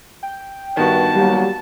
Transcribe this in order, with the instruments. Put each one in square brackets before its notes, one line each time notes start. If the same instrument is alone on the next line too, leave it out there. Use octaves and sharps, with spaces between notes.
[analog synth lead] G5
[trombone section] G2 [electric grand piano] D#3 B3 F#4 [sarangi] A5
[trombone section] F#3 A#3 G4 [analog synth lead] G3